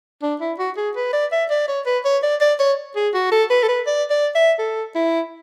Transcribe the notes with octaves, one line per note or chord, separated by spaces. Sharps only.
D4
E4
F#4
G#4
B4
D5
E5
D5
C#5
B4
C#5
D5
D5
C#5
G#4
F#4
A4
B4
A4
B4
D5
D5
E5
A4
E4